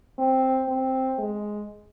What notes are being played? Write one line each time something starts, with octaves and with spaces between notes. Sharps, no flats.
C4
C4
G#3